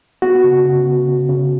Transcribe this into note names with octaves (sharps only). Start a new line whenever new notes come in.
B3 F#4
C#3
C#3
B3
C#3
C#3